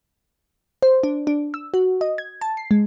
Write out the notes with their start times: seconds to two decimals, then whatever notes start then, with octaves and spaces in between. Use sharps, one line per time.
0.82 C5
1.03 D4
1.27 D4
1.54 E6
1.74 F#4
2.01 D#5
2.18 G#6
2.41 A5
2.57 C7
2.71 G#3